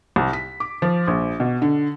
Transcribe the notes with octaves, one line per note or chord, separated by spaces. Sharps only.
C2
B6
D6
F3
A#1
B2
D3